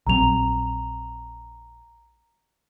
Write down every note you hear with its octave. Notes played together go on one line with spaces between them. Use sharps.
A#1 F#3 C4 A#5 F7